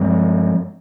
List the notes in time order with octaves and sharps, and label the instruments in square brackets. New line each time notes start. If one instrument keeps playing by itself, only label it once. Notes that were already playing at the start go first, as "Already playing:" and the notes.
Already playing: [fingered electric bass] G2 F3 G#3 C4